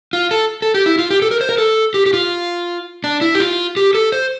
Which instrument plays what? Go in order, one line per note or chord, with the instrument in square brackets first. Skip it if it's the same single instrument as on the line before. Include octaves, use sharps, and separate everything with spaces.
[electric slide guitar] F4
A4
A4
G4
E4
F4
G4
A4
A#4
C5
A#4
A4
G4
G4
F4
D4
E4
G4
F4
G4
A4
C5